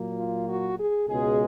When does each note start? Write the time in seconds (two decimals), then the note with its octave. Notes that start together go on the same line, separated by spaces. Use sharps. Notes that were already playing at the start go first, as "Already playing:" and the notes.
Already playing: A#2 F#3 A#3
0.15 F4
0.46 F#4
0.77 G#4
1.08 C#2 B2 G#3 G#4